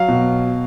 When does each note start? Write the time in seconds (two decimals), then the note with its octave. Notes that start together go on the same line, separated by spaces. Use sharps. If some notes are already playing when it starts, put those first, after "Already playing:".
Already playing: F#3 F5
0.08 B2